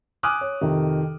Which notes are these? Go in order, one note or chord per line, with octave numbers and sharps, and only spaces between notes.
G#5 D6 D#6 F6 F#6
C#5
F2 C3 D#3